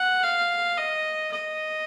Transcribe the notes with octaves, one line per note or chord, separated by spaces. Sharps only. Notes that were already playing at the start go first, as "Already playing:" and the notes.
Already playing: F#5
F5
D#5
D#5